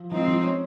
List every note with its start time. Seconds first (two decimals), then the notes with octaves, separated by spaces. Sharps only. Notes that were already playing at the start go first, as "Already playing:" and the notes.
Already playing: F3
0.11 F3 G#3 C4 D#4
0.28 F3
0.43 C#4